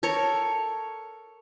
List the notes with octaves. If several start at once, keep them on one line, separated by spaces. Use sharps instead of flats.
A4 A#4 C#5